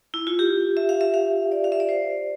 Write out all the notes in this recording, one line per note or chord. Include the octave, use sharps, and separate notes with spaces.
E4
F4
G4
E5
F5
E5
F5
D5
F5
E5
D5
C5